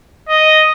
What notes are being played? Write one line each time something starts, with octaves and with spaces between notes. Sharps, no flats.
D#5